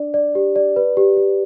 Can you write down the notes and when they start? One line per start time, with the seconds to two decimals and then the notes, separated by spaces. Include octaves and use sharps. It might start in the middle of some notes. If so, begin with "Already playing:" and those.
Already playing: D4 D5
0.14 D5
0.35 G4
0.56 D5
0.76 B4
0.97 G4
1.17 G4